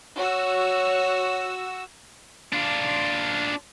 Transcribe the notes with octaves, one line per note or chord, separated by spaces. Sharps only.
F#4 C#5 E6
D4 F4